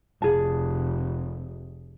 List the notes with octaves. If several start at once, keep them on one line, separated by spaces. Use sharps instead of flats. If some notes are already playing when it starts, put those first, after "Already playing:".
F1 G#4 A5